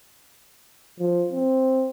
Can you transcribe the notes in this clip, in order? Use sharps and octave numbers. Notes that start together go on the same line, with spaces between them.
F3
C4